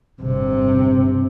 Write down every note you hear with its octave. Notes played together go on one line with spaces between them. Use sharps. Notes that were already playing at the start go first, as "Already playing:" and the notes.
G1 C3